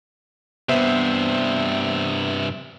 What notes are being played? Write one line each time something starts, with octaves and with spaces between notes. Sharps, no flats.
G2 C3 B3 C5 E5